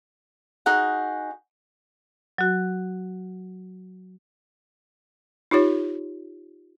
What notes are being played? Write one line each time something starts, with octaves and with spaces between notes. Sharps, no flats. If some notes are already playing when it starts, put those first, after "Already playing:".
D#4 F#4 G#4 F#5
F#3 F#4
D#4 F4 G4 C#5